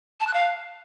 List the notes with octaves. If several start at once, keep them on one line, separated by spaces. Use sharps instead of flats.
A5
F#6
F5